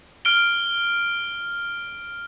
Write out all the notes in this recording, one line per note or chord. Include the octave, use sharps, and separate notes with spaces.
F6 D7 G7